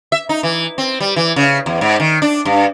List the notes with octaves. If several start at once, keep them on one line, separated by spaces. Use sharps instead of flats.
E5
D#4
E3
C4
G3
E3
C#3
E2
G#2
D#3
D4
G2